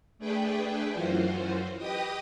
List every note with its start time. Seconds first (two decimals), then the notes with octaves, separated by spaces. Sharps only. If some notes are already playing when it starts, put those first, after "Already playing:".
0.19 A3 D4 G#4 B4 G5
0.91 F#2 E3 F4 F#4 C5
1.78 G4 B4 D#5 G5 D#6